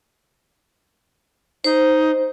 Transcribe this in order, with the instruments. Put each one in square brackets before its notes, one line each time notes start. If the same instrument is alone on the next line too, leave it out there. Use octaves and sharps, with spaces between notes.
[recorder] D#4 [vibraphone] C5